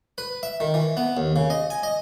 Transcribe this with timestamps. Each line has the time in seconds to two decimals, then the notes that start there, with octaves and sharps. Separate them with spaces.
0.18 B4
0.43 E5
0.60 D#3
0.74 E3
0.97 B3
1.17 D#2
1.36 C#3
1.50 D#5
1.70 G#5
1.83 D#5